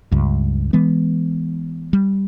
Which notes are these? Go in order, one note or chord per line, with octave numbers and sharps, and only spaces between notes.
C#2 G2
E3 G#3 B3
G3